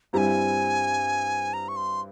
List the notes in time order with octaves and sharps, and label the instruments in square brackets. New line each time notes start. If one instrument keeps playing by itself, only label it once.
[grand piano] G2 G3 C4 E4 G4 [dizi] G#5 A#5
[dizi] A#5
C#6
C6